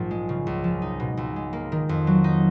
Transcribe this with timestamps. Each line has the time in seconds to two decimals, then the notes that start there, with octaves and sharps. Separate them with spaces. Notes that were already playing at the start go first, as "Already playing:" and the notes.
Already playing: A#1 G#2 F3
0.11 G#3
0.29 C#3
0.47 C#2
0.64 F3
0.82 D#4
1.00 B2
1.17 C#2
1.36 G#3
1.53 A#3
1.72 D#3
1.89 F2
2.07 F#3
2.24 D#4